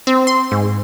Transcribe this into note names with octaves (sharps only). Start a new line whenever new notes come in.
C4
C6
G#2